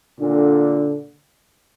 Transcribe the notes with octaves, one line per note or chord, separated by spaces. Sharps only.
A#2 D3